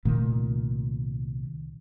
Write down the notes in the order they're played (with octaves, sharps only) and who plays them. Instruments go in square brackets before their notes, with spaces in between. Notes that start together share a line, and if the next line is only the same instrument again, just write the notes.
[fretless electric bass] C2 A#2 D#3 A3